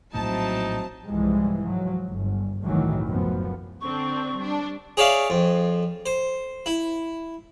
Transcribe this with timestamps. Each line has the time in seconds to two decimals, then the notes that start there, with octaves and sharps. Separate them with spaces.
0.14 A#1 A2 F#3 G#3 C4 D#4 E4 A5
1.07 C2 G#2 E3 F3 G3 G#3
1.64 F3 F#3
2.08 G1
2.62 G1 C2 A2 D#3 E3 F#3
3.05 F1 F#2 F3 B3
3.81 D3 C4 D4 C#6
4.36 G3 D4
4.97 G#4 C#5 D5 E5 F5
5.30 F2
6.06 C5
6.66 E4